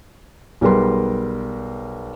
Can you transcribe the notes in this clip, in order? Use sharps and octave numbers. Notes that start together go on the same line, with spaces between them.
B1 G3 G#4 A#4 B4 C6